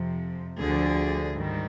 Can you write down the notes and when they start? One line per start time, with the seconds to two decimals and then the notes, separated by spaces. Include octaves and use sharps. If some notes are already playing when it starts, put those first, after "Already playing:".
Already playing: F2 C3 F3
0.60 D2 D3 F3 G#4
1.37 G#2 D#3 G3